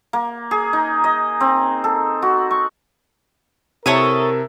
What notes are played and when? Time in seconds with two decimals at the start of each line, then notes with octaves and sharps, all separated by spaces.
0.13 A#3
0.51 G#4
0.73 D#4
1.04 D#5
1.40 C4
1.84 A4
2.22 F#4
2.51 C#6
3.86 C3 E4 A4 A#4 C#5 E5 A5 D#6